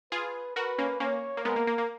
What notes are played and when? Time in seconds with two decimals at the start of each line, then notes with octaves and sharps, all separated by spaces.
0.12 F4 G#4 B4
0.56 F#4 A#4 B4
0.78 A#3 C#4
1.00 A#3 C#4 C#5
1.37 A#3
1.45 G#3 B3 A#4
1.56 A#3
1.67 A#3
1.78 A#3